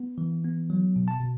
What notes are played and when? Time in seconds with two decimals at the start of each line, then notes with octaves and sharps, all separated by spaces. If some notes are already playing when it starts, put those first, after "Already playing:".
Already playing: B3
0.18 E3
0.44 B3
0.70 F#3
0.96 B2
1.08 A5
1.20 B2